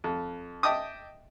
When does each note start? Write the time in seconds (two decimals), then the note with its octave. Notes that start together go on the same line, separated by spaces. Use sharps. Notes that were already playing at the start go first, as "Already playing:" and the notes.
0.04 F2
0.63 D#5 E5 G5 A5 D6 D#6